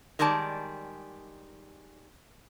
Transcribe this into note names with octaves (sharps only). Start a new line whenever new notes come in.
D#3 G3 G#3 D5 A5